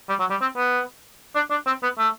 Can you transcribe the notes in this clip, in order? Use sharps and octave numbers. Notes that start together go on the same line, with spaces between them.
G3
F#3
G3
C4
B3
D4
D4
C4
B3
A3